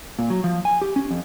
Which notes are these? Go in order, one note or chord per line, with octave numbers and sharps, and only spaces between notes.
A#2
F#3
F3
G#5
G4
C#4
F2